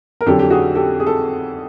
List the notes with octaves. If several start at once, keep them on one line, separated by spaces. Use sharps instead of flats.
A#4
F2 D3 F#3 G4 A4
G4
F#4 G#4
G4 A4
G#4
A4